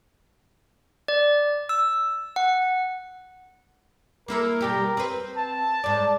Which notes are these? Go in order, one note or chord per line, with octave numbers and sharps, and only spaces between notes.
D5
E6
F#5
A#3 E4 A4 A#4
B2 G3 G4
C4 B4
A5
G#2 D5